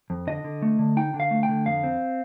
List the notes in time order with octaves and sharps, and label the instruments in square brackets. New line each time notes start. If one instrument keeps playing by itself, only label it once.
[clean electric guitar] F2
D3 D#5
D3
A3
D3
D#4 G5
D3
F5
A3
G5
D3
F2 F5
C4